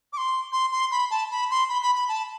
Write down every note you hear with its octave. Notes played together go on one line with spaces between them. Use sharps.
D6
C6
C6
C6
B5
A5
B5
C6
B5
B5
B5
A5